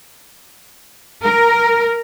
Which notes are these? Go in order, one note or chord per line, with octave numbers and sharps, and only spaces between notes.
A#4